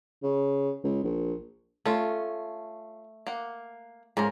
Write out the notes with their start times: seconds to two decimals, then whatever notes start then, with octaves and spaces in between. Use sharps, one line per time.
0.23 C#3
0.84 C#2
1.04 A#1
1.86 A3 C#4 F4
3.27 A#3 F#5
4.17 G#2 F3 C#4 A#4